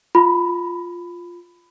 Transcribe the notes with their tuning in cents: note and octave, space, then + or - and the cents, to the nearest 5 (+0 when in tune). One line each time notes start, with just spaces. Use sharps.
F4 +0 B5 +15